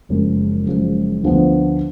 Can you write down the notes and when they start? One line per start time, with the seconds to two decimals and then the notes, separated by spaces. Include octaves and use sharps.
0.09 F#1 F#2 F3 G#3
0.66 F#1 F#2 F3 G#3
1.23 D2 D3 F3 B3